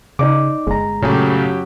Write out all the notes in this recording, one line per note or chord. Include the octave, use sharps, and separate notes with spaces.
C#3 D#4 D5 D6
G1 G#3 A#5
F#2 A#2 C#3 F#3 A3 G4